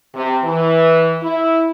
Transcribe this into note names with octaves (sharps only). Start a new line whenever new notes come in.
C3
E3
E4